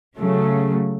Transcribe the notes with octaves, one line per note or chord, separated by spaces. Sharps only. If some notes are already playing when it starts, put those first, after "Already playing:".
C#3 F#3 A3